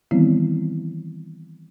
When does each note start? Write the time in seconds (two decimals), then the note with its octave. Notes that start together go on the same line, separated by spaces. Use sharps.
0.11 D#3 E3 G3 B3 C4 E4